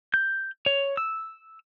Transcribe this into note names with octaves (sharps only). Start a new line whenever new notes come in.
G6
C#5
E6